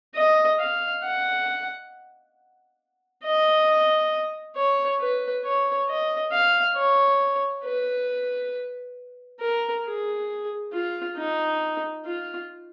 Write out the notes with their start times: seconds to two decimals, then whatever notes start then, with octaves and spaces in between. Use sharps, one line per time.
0.15 D#5
0.59 F5
1.03 F#5
3.24 D#5
4.56 C#5
5.00 B4
5.44 C#5
5.88 D#5
6.32 F5
6.76 C#5
7.64 B4
9.40 A#4
9.85 G#4
10.73 F4
11.17 D#4
12.05 F4